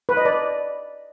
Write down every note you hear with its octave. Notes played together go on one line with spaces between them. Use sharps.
B4
D#5
D5